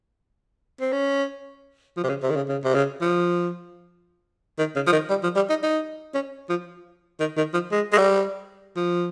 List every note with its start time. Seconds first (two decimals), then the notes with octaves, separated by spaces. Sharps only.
0.81 C4
0.93 C#4
1.97 F3
2.04 C3
2.09 C#3
2.23 C3
2.30 D#3
2.36 C#3
2.49 C#3
2.64 C3
2.75 C#3
3.01 F3
4.59 D#3
4.76 C#3
4.87 F3
4.93 D#3
5.10 G3
5.23 F3
5.36 G3
5.49 D#4
5.63 D#4
6.15 C#4
6.50 F3
7.20 D#3
7.37 D#3
7.54 F3
7.72 G#3
7.93 G#3
7.98 G3
8.76 F3